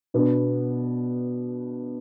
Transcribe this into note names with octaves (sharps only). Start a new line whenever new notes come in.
B2 B3 D4